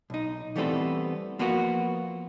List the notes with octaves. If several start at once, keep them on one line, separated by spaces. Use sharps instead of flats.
B1 D#4
E3 G3 A3 B3 C4 A4
F3 A#3 B3 F4 F#4